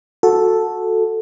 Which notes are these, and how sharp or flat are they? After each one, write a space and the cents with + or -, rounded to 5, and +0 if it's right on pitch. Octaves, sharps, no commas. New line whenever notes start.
F#4 -15 A4 +0